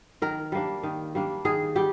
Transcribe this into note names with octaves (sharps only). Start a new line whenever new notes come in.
D#3 A#4
G3 A#3 D4
D#3
G3 A#3 D4
D#3 G#4
G3 G4